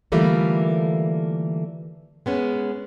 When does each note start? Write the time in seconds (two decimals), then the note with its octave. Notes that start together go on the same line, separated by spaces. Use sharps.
0.12 D3 E3 G3 A3 A#3 F4
2.26 G#3 B3 C#4